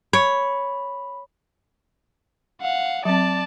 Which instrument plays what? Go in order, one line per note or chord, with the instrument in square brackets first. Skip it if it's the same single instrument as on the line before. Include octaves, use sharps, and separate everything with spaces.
[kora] C#5 [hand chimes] B5
[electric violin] F5 F#5
[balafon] F#3 C4 [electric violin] D5 A5